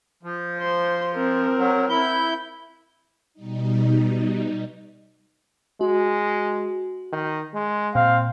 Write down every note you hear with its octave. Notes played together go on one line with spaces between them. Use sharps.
F3
C5 C6
C4 A#4
F#3
E4 G6
B2 G3 D#4
G#3 F#4
D#3
G#3
A#2 C4 F5